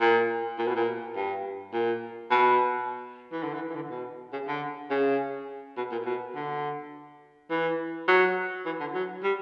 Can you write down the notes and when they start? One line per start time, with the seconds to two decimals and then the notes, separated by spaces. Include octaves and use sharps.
0.01 A#2
0.58 A#2
0.67 B2
0.76 A#2
1.16 G2
1.73 A#2
2.31 B2
3.32 E3
3.43 D3
3.53 E3
3.70 E3
3.75 D3
3.90 B2
4.33 C#3
4.48 D3
4.90 C#3
5.77 B2
5.91 A#2
6.06 B2
6.35 D3
7.50 E3
8.07 F#3
8.65 E3
8.80 D3
8.94 F#3
9.23 G3